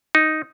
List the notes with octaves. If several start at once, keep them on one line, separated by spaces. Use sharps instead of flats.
D#4